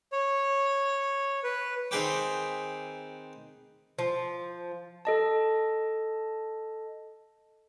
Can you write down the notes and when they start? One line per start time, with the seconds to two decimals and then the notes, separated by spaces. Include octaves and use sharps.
0.12 C#5
1.44 B4
1.91 D#3 C4 G#4 B4 G5 D6
3.99 F3
5.05 A4 D#5 A5